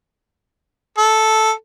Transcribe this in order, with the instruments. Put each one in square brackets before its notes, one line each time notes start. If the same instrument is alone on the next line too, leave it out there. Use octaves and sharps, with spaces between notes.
[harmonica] A4